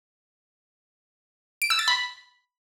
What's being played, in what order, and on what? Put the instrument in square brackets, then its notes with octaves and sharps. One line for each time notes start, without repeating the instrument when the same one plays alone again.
[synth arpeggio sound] D7
E6
A6
B5